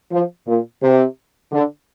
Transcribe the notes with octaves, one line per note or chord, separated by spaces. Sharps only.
F3
A#2
C3
D3